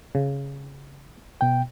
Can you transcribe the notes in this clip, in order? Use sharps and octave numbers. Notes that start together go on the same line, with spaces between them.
C#3
B2 G5